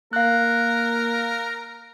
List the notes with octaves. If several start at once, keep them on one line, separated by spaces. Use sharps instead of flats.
A#3 A#4 F5 F#6